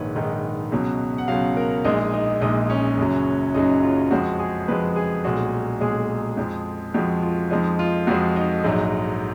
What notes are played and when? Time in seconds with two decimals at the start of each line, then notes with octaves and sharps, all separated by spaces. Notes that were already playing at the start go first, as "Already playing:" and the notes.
Already playing: A#1 G#2 D#3 B4 C#5
0.15 A#1 G#2 D#3 D#5
0.72 C#2 B2 F#3
1.18 F#5
1.28 C#2 B2 F#3 F5
1.57 A#4
1.84 A#1 A#2 G#3 D#4
2.13 D#4
2.41 A#1 A#2 G#3 D#4
2.70 C#4
2.98 F#1 F#2 C#3 F#3
3.54 F#1 F#2 C#3 F#3 D#4
3.83 F4
4.11 F2 F3 G#3 F#4
4.40 G#4
4.68 F2 F3 G#3 B4
4.96 G#4
5.24 B1 A#2 G#3 F#4
5.81 B1 A#2 G#3 G#4
6.37 F2 F3 G#3
6.94 F2 F3 G#3 F#4
7.23 F4
7.51 F2 F3 G#3 D#4
7.79 F4
8.07 F2 F3 G#3 F#4
8.36 D#4
8.64 A#1 G#2 F#3